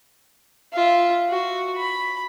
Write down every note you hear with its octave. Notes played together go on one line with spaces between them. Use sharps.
F4 E5
F#4
B5